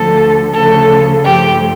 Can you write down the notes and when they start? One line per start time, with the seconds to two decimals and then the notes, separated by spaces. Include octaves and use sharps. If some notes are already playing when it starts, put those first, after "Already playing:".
Already playing: D2 D3 F3 A4
0.52 D2 C#3 F3 A3 A4
1.23 G2 F3 A3 G4